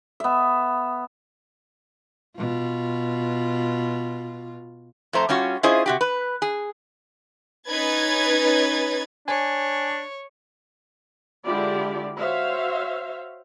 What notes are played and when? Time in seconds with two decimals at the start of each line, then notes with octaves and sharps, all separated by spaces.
0.20 B3 E5
2.37 B2 F4
5.13 F2 A3 C5 A#5
5.29 G3 C#4 F4 F#4
5.63 C#4 E4 F4 G#4 C5 D#5
5.86 C3 F#4 G4
6.01 B4
6.42 G#4
7.69 C#4 D#4 B4 G#6 A6
9.28 D4 C#5 G#5
11.44 D3 G#3 E4 F4 G4 D5
12.17 F#4 C5 C#5 E5 F5